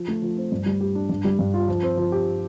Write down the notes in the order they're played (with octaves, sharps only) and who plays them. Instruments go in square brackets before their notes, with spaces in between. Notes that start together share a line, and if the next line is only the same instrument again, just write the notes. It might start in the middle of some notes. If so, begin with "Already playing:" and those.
Already playing: [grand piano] F3
A3
F3
C4
G2
G3
G4
D4
G2
G3
G2
F4
F3
C4
F3
G4